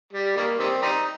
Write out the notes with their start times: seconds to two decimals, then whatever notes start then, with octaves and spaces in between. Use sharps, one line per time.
0.13 G3
0.37 D#3 G3 A#3
0.59 D#3 G3 C4
0.82 G3 C4 D#4